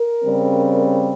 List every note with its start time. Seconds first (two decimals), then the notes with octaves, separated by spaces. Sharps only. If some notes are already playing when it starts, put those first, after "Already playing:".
Already playing: A#4
0.23 C#3 G3 C4